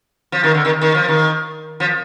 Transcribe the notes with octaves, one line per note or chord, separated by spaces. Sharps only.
F3
D#3
D3
D#3
D#3
F3
D#3
F3